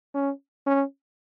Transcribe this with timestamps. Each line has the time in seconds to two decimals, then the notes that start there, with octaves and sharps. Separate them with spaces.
0.14 C#4
0.67 C#4